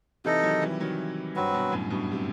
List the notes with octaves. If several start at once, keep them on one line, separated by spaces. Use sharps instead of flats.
C3 E3 D#4 A4 D#5
D#3 F#3
E3 G3
D#3 F#3
G2 F#3 C4 F#4 B4
G2 B2
F#2 A2
G2 B2
C3